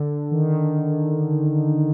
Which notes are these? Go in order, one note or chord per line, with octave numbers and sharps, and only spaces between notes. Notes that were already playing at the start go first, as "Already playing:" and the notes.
Already playing: D3
D#3